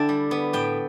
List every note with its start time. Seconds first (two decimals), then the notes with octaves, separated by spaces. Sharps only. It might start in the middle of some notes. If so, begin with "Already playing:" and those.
Already playing: D3 E4 G5 A5
0.09 G3
0.31 B3
0.53 A2 G5